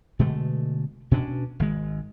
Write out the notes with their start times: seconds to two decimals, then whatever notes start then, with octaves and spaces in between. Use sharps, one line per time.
0.19 B2 D3 G#3 A3
1.11 B2 C#4 D4
1.60 G#1 D#3 G#3